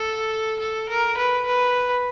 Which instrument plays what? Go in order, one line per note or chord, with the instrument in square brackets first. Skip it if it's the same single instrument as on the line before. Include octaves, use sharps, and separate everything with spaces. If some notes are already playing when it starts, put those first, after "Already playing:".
Already playing: [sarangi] A4
A4
A#4
B4
B4